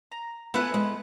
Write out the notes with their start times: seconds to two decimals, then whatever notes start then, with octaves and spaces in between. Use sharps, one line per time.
0.12 A#5
0.54 A3 B3 E4 B4 G#5 F#6
0.74 G#3